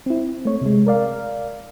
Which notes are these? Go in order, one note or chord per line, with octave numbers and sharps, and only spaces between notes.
C4 E4
A3 C#5
C3 G#3
A#4 D5 F5